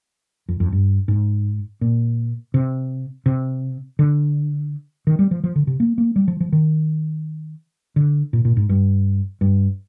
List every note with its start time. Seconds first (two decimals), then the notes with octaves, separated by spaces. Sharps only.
0.49 F2
0.60 F2
0.72 G2
1.08 G#2
1.81 A#2
2.54 C3
3.26 C3
3.99 D3
5.07 D#3
5.19 G3
5.31 F3
5.44 F3
5.56 D3
5.67 C3
5.80 A#3
5.98 A#3
6.16 G3
6.28 F3
6.40 F3
6.52 D#3
7.96 D3
8.33 A#2
8.45 A#2
8.57 G#2
8.69 G2
9.41 G2